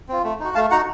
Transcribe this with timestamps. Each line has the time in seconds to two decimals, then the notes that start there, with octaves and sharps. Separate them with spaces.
0.09 C4 F4
0.24 A3
0.40 D#4 F#4
0.55 A3 F5 A5
0.71 D#4 F#4 F#5 A#5